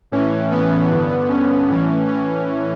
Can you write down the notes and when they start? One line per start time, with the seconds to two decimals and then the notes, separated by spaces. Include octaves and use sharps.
0.12 A2 E3 C#4
0.52 B3
0.90 G2 D3
1.29 C#4
1.68 A2 E3
2.08 C#4